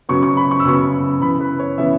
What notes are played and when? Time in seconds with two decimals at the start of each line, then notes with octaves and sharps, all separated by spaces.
0.09 C#3 F#3 B3 C#6
0.23 C#6
0.37 B5
0.51 C#6
0.60 E6
0.65 C#3 F#3 B3 C#6
1.22 C#3 E3 B3 B5
1.40 B4
1.60 C#5
1.78 C#3 E3 B3 E5